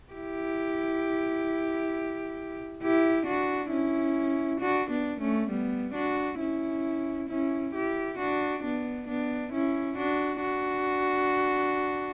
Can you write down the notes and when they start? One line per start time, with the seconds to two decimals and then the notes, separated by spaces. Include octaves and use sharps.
0.13 E4 G4
2.82 E4 G4
3.26 D4 F#4
3.71 C#4 E4
4.61 D4 F#4
4.90 B3 D4
5.20 A3 C#4
5.51 G3 B3
5.94 D4 F#4
6.39 C#4 E4
7.29 C#4 E4
7.74 E4 G4
8.18 D4 F#4
8.64 B3 D4
9.08 B3 D4
9.53 C#4 E4
9.97 D4 F#4
10.41 D4 F#4